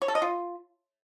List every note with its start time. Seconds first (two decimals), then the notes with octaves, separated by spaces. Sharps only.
0.02 C#5
0.08 A4
0.15 D#5
0.22 F4